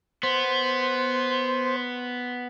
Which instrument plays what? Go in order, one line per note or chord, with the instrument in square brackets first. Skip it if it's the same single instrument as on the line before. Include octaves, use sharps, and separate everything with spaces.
[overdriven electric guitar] B3 [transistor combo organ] C5